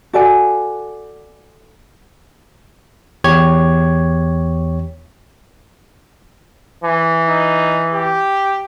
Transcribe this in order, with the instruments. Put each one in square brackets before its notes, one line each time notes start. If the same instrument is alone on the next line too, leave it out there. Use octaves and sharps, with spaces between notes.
[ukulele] F#4 A4 D5 G#5
[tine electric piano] E2 G4 C#5 G#6
[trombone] E3
[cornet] D#4
G4